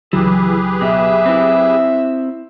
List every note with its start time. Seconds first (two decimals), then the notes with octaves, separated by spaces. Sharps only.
0.13 C#2 E3 F#3 G4 G#4 B4
0.81 B2 E5
1.26 C4 E4